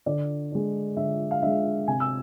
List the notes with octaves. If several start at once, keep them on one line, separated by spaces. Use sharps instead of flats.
D3 D5
G#3 D4
D3 E5
F5
G#3 D4 E5
C3 G#5
E6